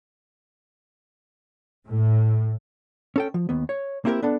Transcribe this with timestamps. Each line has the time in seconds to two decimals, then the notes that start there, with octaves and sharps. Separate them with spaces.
1.88 A2
3.16 C#4 A4 G5
3.34 F3
3.49 D#2 B3
3.69 C#5
4.05 A#3 C4 E4 G4 G#4 A#4
4.22 B3 D4 A4